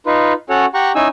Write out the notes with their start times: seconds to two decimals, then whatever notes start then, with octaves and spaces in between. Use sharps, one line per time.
0.06 D#4 F4 B4
0.50 C#4 F#4 A4 C#5 F#5
0.74 G4 F#5 G5 A#5 C#6
0.95 C#4 D#4 E4 G#5 E6